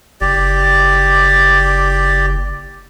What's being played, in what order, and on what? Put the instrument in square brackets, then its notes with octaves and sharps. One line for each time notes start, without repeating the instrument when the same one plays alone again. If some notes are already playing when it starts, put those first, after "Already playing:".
[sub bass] F#1 [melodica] G4 D5